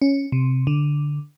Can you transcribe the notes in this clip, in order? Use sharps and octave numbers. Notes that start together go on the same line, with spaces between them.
C#4
C3
D3